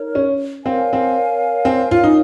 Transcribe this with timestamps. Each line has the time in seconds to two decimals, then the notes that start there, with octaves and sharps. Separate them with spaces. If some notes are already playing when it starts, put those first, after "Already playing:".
Already playing: D#4 A#4 C#5
0.15 C#4
0.65 C4 A#4 C#5 F5 G#5
0.93 C4
1.65 C4
1.91 F4
2.04 D#4